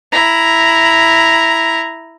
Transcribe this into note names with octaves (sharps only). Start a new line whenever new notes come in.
E4 A#5